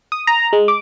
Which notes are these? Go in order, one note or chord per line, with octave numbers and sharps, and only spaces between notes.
D#6
A#5
G#3
D6